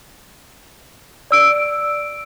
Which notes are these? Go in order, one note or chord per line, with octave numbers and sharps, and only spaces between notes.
D5 E6 D7